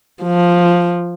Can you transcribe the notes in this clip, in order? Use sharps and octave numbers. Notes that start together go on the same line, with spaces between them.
F3